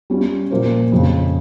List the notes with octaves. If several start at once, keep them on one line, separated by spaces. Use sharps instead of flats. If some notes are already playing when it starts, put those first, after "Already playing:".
G3 C#4 F4
A#2 F3 A#3 F4 C5
F2 C#3 F3